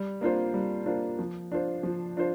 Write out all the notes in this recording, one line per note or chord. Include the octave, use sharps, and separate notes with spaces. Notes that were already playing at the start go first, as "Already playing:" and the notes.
Already playing: G3
A#3 D4 F4 C5
G3
A#3 D4 F4 C5
F3
D4 F4 C5
F3
D4 F4 C5